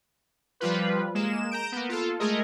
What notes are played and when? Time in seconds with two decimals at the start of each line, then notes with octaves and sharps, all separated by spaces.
0.60 F3 G3 F4 B4
1.15 G#3 A#3 E7
1.50 A#5 G6 D7 E7
1.72 A#3 B3
1.89 F4 A4
2.19 G#3 A3 G#4 A#4 D#5